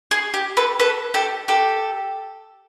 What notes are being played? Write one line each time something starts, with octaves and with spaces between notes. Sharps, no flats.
G#4
G4
A4 B4
A4 B4
G4 A4
G4 A4